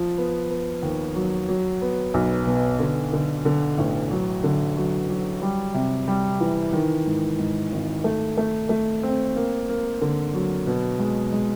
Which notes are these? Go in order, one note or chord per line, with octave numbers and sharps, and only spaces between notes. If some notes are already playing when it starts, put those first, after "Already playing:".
Already playing: F3
B3
B3
D#2
F#3
F#3
B3
B1
B2
D3
D3
D3
A1
F#3
D3
F#3
F#3
G3
C3
G3
E3
D#3
G#2
G#2
G#1
A3
A3
A3
C4
A#3
A#3
D3
F#3
B2
G#3
G#3